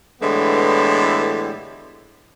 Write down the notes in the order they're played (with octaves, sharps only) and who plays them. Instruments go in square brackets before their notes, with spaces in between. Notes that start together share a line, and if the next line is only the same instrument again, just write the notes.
[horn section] A2 D3 E3 G#3 B3 G4